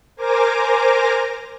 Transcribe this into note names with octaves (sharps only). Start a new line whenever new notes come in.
A#4 C5 G#5 A#5 D6 A#6